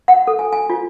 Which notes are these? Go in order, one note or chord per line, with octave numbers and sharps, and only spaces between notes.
F#5
A4
G#5
G#5
F4